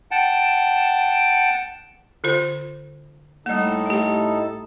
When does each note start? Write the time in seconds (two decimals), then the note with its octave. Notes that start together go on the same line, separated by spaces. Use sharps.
0.11 F#5 G5 A5
2.24 D3 F4 C5
3.46 A2 G3 A#3 D#4 A4
3.86 A3 G4